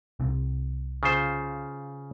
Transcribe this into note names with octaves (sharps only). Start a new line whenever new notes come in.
C2 C3 C4
C#3 F4 C5